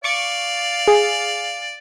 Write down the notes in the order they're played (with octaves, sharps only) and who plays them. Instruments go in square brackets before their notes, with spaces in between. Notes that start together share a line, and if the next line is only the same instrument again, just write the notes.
[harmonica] D5 F5 [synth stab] C#6 D6
[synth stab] G#4